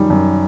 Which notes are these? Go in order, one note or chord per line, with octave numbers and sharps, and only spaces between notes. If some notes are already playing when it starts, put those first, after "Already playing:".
Already playing: F#2 D#3 G3
F#2